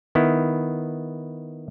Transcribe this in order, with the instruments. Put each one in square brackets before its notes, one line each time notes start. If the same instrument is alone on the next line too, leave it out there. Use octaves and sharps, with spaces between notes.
[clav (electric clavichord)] D#3 B3 E4